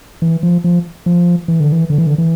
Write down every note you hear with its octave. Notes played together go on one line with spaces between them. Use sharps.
E3
F3
F3
F3
E3
D3
E3
D3
E3
D3
E3